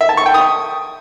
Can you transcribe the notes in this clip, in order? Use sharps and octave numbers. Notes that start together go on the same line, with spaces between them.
E5
A5
C#6
G5
D#6